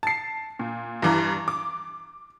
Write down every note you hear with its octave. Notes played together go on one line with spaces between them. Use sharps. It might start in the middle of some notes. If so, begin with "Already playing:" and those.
A5 C7
A#2
G2 E3 A#5
D6